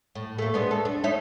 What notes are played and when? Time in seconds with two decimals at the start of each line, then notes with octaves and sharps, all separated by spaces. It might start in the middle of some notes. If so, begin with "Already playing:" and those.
0.15 A2
0.38 A3 A#3
0.54 G#3 B3 D4
0.71 A4
0.85 D4
1.04 D#4 C#5 E5